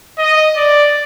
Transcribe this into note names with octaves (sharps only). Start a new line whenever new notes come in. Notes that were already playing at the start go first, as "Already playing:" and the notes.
D#5
D5